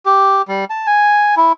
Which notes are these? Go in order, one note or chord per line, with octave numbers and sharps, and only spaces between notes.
G4
G3
A5
G#5
E4